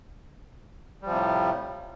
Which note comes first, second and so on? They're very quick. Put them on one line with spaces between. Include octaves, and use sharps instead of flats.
G3 F3 C3 A2